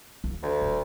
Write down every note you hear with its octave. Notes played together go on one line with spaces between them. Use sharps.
D#2
D2
D#1